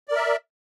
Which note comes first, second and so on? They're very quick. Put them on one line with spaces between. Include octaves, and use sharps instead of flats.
D5 A#4 E5